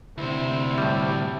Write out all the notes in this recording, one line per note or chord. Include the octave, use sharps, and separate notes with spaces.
D2 C3 E4 C5
A2 G3